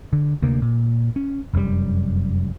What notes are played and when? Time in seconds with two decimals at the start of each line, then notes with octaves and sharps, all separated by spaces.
0.13 D3
0.42 D2 C3 A#3
0.62 A#2
1.16 C#4
1.54 F1 F#2 A#2 G3